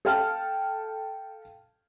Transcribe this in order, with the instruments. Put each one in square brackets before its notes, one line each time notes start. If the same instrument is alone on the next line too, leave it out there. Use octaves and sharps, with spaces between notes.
[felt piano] A4 F5 G5 A5 F6